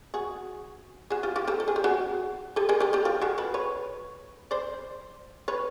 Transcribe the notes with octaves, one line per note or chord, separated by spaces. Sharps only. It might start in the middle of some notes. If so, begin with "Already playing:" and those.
F#4 G#4
F#4 G#4
F4 G4
F4 G4
G4 A4
A4
G#4
G4
F#4 G#4
G4 A4
G#4 A#4
G4 A4
G4 A4
F4 G4
F#4 G#4
A4 B4
B4 C#5
C5 D5
B4 C#5